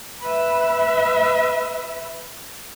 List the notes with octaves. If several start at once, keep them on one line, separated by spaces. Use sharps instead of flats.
B4 E5